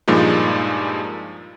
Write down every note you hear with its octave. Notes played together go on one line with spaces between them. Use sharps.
G2 A#2 F3 G#3 D#4